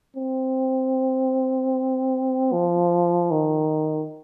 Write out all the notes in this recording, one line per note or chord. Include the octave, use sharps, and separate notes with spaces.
C4
F3
D#3